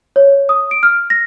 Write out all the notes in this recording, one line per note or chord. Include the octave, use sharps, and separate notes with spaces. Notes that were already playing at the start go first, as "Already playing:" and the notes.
C#5
D#6
D7
F6
A#6